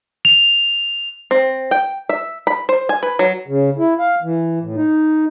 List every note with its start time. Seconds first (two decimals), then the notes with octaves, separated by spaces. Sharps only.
0.25 F7
1.31 C4
1.71 G5
2.09 E5
2.47 B5
2.69 C5
2.89 G#5
3.03 B4
3.19 F#3
3.47 C#3
3.78 E4
3.99 F5
4.22 E3
4.61 A2
4.76 D#4